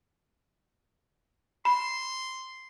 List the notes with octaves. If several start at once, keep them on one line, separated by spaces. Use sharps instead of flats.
B5 C6